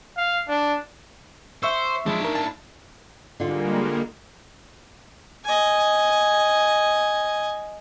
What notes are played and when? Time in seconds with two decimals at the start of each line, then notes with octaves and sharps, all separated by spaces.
0.17 F5
0.48 D4
1.63 C5 E5 C#6 E6
2.06 F3 G#3 D4 E4
2.21 D#4 A#4
2.35 A5
3.40 D3 G3 G#3 A#3 F4
5.45 D#5 G#5